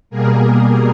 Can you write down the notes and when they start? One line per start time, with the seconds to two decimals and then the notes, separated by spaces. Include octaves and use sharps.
0.10 B2 G3 A#3 G#4 A#4
0.48 G#4 A#4